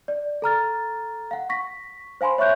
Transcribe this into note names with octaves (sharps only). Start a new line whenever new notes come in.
D5
A4 A#5 F6 A6
F5 F#5
C#6 A#6 B6
C5 F5 G#5 B5 C6
C#5 E5 C#6 F#6 G6